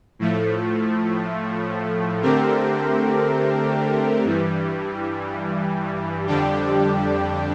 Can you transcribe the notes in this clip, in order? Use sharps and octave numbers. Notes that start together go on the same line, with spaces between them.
A2 F3 A3
D3 A3 C4 G4 A#4
G2 E3 G3
F2 D3 G3 D4 G4